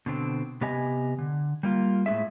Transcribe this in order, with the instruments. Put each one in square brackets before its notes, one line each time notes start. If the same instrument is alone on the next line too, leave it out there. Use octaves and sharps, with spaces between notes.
[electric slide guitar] B2 D3 C4
C3 B3 G4 D#5 G#5
D3
G3 A#3 F4
A2 G#3 C#4 G#4 E5